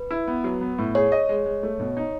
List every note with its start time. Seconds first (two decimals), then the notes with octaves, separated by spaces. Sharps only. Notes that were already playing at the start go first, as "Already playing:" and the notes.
Already playing: B4
0.11 E4
0.28 B3
0.44 F#3
0.61 B3
0.78 A2
0.95 G#4 C#5
1.12 D#5
1.29 G#3
1.46 G#3
1.63 A3
1.80 B2
1.97 D#4